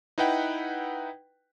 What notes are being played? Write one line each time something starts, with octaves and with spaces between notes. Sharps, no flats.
D#4 E4 B4 F#5 G5